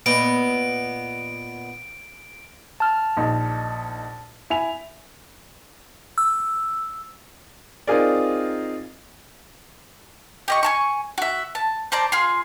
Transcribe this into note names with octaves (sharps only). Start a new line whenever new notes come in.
A#2 B3 D#5 D7
A5 F6
A#1 D#4
E4 G#5 F7
E6
C4 D#4 F4 G#4 A#4 D5
G4 D#5 C#6
G#5 A5 C#6
F#4 E5
A5
C5 D5 A5 A#5
F4 G#4 C6